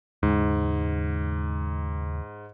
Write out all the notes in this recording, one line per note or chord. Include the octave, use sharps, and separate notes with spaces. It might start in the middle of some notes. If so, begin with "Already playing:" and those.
D#2 G#2 C#3 G#3